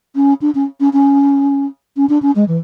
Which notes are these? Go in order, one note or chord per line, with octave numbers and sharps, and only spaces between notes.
C#4
D4
C#4
C#4
C#4
C#4
D4
C#4
G#3
E3